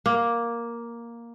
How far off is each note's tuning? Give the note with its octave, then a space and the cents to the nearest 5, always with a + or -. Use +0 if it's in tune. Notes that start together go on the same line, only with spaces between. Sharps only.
A#3 +5